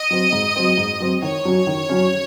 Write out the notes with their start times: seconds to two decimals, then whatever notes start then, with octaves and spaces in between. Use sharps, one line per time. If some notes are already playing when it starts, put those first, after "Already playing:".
Already playing: D#5
0.11 F#3 C4
0.33 G#2
0.56 F#3 C4
0.78 G#2
1.00 F#3 C4
1.22 D#3 C#5
1.45 F#3 C#4
1.67 D#3
1.89 F#3 C#4